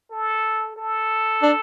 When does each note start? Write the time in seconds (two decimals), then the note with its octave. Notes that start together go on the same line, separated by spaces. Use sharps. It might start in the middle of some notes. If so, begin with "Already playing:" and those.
0.11 A4
0.76 A4
1.42 D4